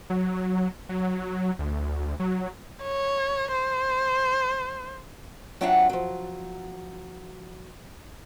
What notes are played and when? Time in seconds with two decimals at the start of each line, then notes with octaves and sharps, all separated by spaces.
0.10 F#3
0.89 F#3
1.59 D2
2.20 F#3
2.83 C#5
3.52 C5
5.61 F#3 C4 D4 F4 E5 F#5
5.90 F3 F#3